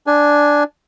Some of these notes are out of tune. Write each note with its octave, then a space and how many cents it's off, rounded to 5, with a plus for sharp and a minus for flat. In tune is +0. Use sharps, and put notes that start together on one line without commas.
D4 +0 G#5 +10